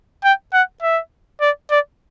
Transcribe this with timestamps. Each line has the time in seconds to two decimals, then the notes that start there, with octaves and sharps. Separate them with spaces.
0.24 G5
0.53 F#5
0.83 E5
1.41 D5
1.71 D5